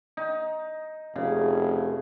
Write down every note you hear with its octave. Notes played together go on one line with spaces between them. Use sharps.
D#4
F1 C#3